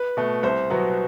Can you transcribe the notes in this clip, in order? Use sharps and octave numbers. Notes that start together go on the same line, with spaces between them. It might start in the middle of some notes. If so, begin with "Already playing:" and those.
Already playing: B4
B2 A3
C2 C5
B2 F#3 B3